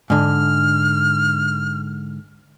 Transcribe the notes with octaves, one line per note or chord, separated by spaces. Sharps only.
G#2 D3 F6